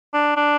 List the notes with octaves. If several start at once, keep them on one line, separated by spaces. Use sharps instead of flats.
D4
D4